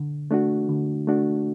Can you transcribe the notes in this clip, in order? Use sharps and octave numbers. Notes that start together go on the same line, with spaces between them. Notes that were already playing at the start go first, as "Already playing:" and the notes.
Already playing: D3
A3 D4 F#4
D3
A3 D4 F#4